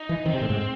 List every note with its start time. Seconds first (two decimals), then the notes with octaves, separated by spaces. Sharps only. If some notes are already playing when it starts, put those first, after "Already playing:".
Already playing: D#4
0.09 E3
0.25 D#3 C4
0.33 C3
0.41 A2
0.50 G#2